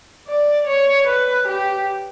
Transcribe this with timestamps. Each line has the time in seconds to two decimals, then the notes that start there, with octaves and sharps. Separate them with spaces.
0.28 D5
0.67 C#5
1.07 B4
1.47 G4